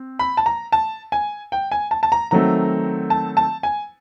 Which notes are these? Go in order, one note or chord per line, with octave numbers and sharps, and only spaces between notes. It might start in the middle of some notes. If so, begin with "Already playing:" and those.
Already playing: C4
B5
A5
A#5
A5
G#5
G5
G#5
A5
A5
A#5
D#3 F#3 A3 C4 A#5
A5
A5
G#5